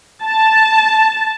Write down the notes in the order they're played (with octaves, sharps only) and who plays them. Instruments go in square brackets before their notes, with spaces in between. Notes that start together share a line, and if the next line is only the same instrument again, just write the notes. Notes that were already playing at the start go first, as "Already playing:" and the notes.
[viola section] A5